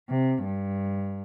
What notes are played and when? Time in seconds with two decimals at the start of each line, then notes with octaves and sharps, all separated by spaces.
0.11 C3
0.44 G2